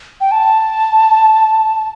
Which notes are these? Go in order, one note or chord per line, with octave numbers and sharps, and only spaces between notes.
G5
A5